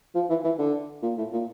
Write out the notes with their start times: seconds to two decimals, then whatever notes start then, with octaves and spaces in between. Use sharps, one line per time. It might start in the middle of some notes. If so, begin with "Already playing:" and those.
0.15 F3
0.29 E3
0.44 E3
0.59 D3
1.02 A#2
1.18 A2
1.32 A#2